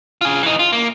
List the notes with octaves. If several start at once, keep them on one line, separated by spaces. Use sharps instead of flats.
F4 G#4
E3 D#4
F4
A#3